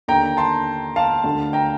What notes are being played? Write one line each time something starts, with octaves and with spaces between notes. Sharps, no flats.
D#2 D3 G5 A#5
A5 C6
F5 A5
D2 D3
G5 A#5